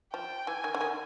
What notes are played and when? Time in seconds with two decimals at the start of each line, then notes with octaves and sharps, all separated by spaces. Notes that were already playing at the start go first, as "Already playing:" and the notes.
0.13 F3 G5
0.47 E3 G#5
0.64 D#3
0.74 D3
0.81 D#3